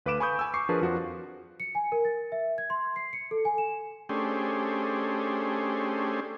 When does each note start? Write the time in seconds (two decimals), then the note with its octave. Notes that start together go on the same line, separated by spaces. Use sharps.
0.06 D2 B4 F5 D6 D7 E7
0.20 G#5 B5 C#6 D#6 G6
0.39 G#5 E6
0.54 C#6 D6 C7
0.69 F3 D4 G#4 A#4 B4
0.81 F2 F3 F#4
1.60 C#7
1.75 G#5
1.92 A#4
2.05 A6
2.32 E5
2.58 G#6
2.70 C6
2.96 C7
3.13 C#7
3.31 A4
3.45 G#5
3.58 E7
4.09 A3 C#4 D4 G4 G#4 C5